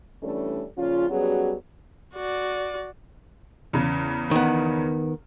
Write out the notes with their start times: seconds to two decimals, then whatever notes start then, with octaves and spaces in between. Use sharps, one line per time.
0.23 E3 G3 A3 C#4 D4 A4
0.78 A#2 C#3 F3 C#4 F4
1.09 F#3 G3 B3 C#4 F#4 G#4
2.15 F#4 D5
3.73 E2 C#3
4.31 D#3 B3